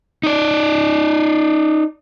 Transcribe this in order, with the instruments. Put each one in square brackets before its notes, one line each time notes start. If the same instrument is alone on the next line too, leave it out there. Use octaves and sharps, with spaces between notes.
[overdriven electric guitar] D#4 D5